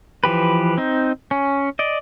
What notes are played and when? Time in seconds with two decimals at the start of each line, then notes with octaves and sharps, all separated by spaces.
0.24 E3 F3 G4 B4
0.78 C4 D#4
1.31 C#4
1.79 D5 D#5